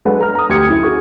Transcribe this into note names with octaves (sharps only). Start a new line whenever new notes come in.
F#3 G#3 D4 A4 B4 F#5
A#5 F6
A#5 D#6
D2 G4 G#6 C#7
F#2 E4
F#4 G#4